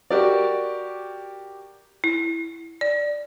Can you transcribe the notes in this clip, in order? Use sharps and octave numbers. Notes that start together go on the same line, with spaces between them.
F#4 G4 A#4 D5
E4
D5